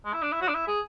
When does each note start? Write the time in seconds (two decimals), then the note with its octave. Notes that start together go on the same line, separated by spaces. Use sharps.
0.05 G#3
0.14 E4
0.23 D4
0.32 E4
0.41 F#4
0.49 D4
0.55 E4
0.67 G#4